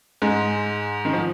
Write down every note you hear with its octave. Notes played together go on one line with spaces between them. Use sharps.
G#2 G#3
D#3
F3